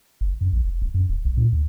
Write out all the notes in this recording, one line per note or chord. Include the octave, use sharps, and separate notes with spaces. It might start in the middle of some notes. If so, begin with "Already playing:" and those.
F#1
F#2
A#1
F1
E1
F#2
D#1
C2
A#2
D#2